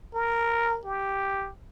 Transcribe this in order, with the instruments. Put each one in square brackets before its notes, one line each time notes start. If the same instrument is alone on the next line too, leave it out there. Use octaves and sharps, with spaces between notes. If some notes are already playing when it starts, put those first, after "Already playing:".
[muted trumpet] A#4
G4